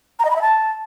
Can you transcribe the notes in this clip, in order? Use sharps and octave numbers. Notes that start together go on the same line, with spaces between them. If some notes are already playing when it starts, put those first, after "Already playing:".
A#5
D#5
B5
E5
A5